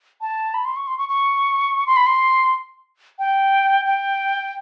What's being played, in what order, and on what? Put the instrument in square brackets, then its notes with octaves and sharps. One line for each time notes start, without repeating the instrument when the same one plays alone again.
[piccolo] A5
B5
C6
C#6
C6
C#6
C#6
C6
B5
C6
G5
G5